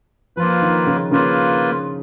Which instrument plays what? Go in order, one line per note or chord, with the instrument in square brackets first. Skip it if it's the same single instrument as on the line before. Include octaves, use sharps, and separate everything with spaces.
[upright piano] F3 [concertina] A#3 F4 B4
[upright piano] D#3
C#3
[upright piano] C#3 [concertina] A#3 F4 B4